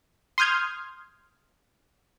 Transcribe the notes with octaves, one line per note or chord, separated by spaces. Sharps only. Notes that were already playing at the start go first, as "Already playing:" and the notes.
C6 D#6 F6 G6 G#6